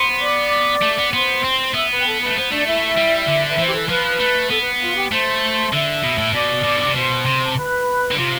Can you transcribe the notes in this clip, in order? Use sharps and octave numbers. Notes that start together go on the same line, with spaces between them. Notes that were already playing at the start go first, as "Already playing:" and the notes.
Already playing: B3 C5 C6
D5 D6
A3
B3
B3 C5 C6
C4
B3 E5 E6
B4 B5
G5
A4 A5
B4 B5
A3
B3 C5
A3 D4 D5
E4 E5
G3
D3
B4
E3 C5
G4
A4
F3 B4
A3
B3 A4
B4
F4 F5
G4 G5
A3 C5 C6
D3 E5 E6
B2
A2
B2 D5 D6
B2
D3
C3
B2 C5 C6
C3
A5
B4 B5
D3
C3 F4 F5